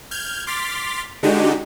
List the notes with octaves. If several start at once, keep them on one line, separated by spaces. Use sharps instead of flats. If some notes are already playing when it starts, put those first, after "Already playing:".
F6 G6 G#6
C6 D6 F6 A6 B6
D3 G#3 D4 D#4 F#4 G4